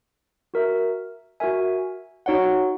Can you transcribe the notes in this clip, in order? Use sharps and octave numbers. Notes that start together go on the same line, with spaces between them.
F#4 A#4 E5
F#4 A#4 E5 G#5
D#4 F#4 C#5 F#5